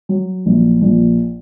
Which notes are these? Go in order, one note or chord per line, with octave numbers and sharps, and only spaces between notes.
F#3
A#1
A#1